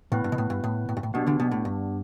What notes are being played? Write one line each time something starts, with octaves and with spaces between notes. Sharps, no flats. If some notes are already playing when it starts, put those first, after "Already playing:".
A2 B3 E4 B4
G2
B2
A2
G2
A2
A2
G2
A2
B1 B2 B3 D4 G4
D2 D3
B1 B2
A2
G2